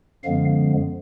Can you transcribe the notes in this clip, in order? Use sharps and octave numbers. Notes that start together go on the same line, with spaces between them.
F#2 D3 F3 G#3 B3 F5